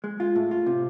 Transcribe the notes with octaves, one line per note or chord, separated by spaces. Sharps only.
G#3
F4
A2
F4
C3